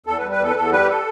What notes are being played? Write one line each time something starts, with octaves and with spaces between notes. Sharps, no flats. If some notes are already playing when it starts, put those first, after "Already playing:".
E2 A4
B4
G3
B4
E2 A4
B4
E2 A4
G3 B4
G4
A4